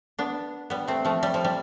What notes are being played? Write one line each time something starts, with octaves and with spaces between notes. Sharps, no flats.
B3 D4
G3 B3
A3 C4
F3 A3
G3
F3
G3